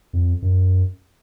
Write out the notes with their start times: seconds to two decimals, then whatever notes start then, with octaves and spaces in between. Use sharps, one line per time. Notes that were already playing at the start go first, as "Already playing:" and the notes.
0.13 F2
0.42 F#2